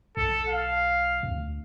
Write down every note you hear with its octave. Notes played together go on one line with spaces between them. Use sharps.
B1 A4
F5
D2